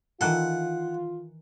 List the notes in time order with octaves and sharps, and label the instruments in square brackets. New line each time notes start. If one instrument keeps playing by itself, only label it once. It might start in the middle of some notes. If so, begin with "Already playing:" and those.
[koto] D#3 E3 A4 [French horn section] F4 [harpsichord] F#5